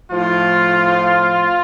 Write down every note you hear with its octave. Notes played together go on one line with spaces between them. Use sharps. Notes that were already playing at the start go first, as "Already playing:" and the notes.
A2 F3 F4